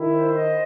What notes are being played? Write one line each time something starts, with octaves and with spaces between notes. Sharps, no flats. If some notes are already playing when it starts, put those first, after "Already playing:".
Already playing: D#3 E4
C5
D#5